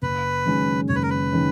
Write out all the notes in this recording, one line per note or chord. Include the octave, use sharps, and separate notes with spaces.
F#1 B4
F#2 D#3 G#3 C#4
F#1 C#5
B4
A#4
B4
D#3 G#3 C#4